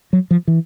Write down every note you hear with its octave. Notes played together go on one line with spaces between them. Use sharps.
F#3
F3
E3